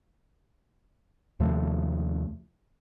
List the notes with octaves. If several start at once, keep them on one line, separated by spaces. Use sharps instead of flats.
D#2 C3 F3 A3